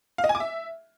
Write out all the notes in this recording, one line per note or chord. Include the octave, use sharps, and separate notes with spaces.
F5
D#5
G#5
D6
E5